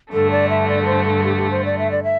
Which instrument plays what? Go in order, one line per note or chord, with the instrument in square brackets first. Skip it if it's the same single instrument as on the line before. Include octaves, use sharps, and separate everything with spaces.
[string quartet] G2 D3 A3 [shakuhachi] A4
[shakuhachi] D5
E5
D5
A4
C5
A4
G4
G4
C5
D5
E5
D5
E5